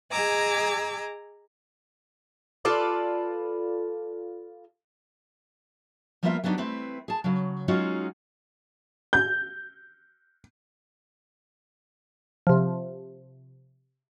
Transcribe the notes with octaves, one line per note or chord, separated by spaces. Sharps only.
G#4 D#5 G#5 A#5 D6 E6
F4 A4 B4 D5
F3 G3 A#3 B3 F4 E5
F#3 B3 D4 D#4 F4 G4
A3 C4 E4 B4
G#4 A5
C#3 F#3
F#3 G#3 C#4 D#4 F4 F#4
G6
C3 F3